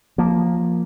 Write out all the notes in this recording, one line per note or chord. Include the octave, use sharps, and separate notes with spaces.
F3 A#3